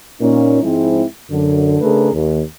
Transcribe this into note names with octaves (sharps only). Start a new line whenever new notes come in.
A#2 C#4 D#4
G#2 F3 G#3 C4 E4
F#2 D3
C#3 A3 D4 G#4 A#4 B4
D#2